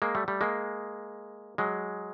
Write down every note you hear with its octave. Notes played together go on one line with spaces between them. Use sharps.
G#3 A#3
G3 A3
G3 A3
G#3 A#3
F#3 G#3